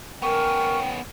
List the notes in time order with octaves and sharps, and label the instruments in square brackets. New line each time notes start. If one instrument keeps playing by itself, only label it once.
[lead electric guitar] B3 C#4 [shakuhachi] A#4 [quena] G5 [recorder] C#6